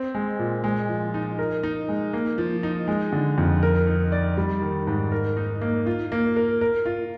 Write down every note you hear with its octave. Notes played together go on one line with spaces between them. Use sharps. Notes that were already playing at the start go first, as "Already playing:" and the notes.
Already playing: C4
G#3
A#2
G#3
F3
D#4
A#4
D#4
G#3
A#3
F3
D#4
G#3
D3
F2
A#4
D#4
D5
G3
D#3
G#2
A#4
D#4
A#3
F4
A#3
A#4
A#4
F4